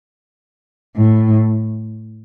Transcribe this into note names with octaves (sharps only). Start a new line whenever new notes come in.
A2